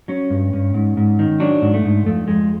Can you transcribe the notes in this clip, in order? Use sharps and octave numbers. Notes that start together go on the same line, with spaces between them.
F#3 C#4
G2
G2
G#2
G#2
D#3
F#3 D4
G#2
A3
G#2
F2 A3
F2 G#3